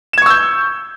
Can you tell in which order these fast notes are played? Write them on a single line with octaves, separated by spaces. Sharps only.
E7 G#6 C#6 E6 G6